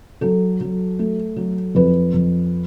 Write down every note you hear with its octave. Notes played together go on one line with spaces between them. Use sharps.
F#3 A4
F#3
A3
F#3
F2 B4
F2